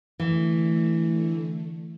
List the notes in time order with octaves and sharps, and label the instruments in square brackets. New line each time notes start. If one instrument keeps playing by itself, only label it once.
[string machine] D3 A3 [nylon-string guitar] E3